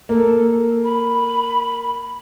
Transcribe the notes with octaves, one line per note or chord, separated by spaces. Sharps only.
A#3 A4
B5